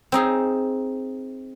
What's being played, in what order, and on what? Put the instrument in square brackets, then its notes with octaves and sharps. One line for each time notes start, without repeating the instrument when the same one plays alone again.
[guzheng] C4 D#4 G#4